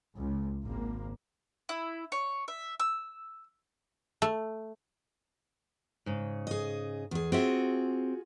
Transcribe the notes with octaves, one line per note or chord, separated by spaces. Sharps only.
C#2
G#1 A#3
E4
C#5
E5
E6
A3
G#2 C#3
G#4 D#5
E2 G#4
C4 F4 F#4 G#4 E5